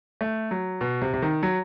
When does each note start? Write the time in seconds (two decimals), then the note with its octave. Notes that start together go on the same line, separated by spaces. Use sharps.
0.21 A3
0.51 F#3
0.81 B2
1.02 C3
1.14 C3
1.22 D#3
1.43 F#3